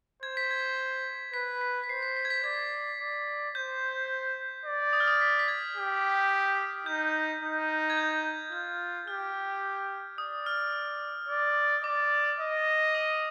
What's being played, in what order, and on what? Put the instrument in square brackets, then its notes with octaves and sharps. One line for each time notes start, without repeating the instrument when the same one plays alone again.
[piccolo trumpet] C5 [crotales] G#6
[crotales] B6
G#6
[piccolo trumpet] B4 [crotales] B6
[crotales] B6
B6
[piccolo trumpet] C5 [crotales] C7
[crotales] B6
B6
G#6
B6
[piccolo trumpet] D5 [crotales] G#6
[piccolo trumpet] D5
[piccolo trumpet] C5 [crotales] G6
[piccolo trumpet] D5
[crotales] D#6
F6
D#6
B6
B6
G#6
[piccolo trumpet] G4
[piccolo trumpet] D#4 [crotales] G6
[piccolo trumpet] D#4
[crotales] G#6
G6
[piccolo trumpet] F4 [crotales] G6
[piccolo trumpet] G4 [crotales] F6
[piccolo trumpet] D5 [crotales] D#6
[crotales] F6
[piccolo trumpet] D5
[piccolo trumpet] D5 [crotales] D6
[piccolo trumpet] D#5
[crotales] D#6